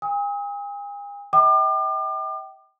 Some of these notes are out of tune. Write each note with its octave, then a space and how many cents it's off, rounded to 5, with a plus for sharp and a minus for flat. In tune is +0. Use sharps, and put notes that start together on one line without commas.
G#5 -45 D#6 +40
E5 -45 G5 -25 D6 +40